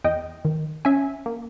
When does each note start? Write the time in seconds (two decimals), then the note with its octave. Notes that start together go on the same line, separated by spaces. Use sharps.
0.04 E2 D#5 G5
0.45 D#3
0.85 C#4 E5 G#5
1.26 A#3